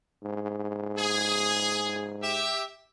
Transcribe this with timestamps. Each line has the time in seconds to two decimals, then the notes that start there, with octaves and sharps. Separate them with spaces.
0.23 G#2
0.97 G#4
2.21 G4 E5